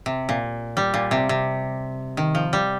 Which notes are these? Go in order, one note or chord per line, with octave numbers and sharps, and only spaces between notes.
C3
A#2
G3
A#2
C3
C3
D#3
F3
G3